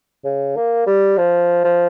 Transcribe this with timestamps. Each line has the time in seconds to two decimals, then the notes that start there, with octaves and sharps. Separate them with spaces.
0.24 C#3
0.56 A#3
0.86 G3
1.17 F3
1.64 F3